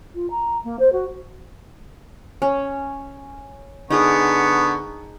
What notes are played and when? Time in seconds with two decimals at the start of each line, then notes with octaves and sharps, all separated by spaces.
0.14 F4
0.30 A#5
0.64 A#3
0.79 C5
0.92 F#4
2.42 C#4
3.90 D3 B3 D#4 G#4 A#4 C#6